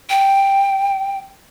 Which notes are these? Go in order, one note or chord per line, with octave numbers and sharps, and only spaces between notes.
G5